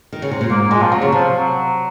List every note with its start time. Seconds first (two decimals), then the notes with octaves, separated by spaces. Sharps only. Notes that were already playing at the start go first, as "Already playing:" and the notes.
0.12 D#3
0.22 C#3
0.31 C3
0.41 A#2
0.50 G#2 A#3
0.61 A#3
0.71 A#2 G#3
0.81 F3
0.92 C3 F#3
1.02 C#3
1.12 C3 F3
1.34 F#3